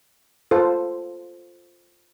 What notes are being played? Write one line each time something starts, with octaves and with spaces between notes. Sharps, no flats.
F4 A4 C5